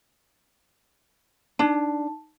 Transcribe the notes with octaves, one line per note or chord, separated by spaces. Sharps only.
D4 D#4 A5